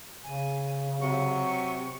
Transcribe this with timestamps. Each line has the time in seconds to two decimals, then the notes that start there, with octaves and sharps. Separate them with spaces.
0.23 C#3 G#5
1.00 C3 F#3 C#6